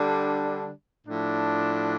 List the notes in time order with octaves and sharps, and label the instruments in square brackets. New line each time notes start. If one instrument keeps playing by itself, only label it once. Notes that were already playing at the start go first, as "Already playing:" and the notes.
Already playing: [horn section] D3 G3 D4
A2 F3 D4